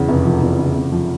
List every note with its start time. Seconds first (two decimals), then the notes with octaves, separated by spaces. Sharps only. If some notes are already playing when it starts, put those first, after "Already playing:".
Already playing: E2 C#3
0.08 F1
0.25 F3
0.42 E2
0.59 C#3
0.75 F1
0.92 F3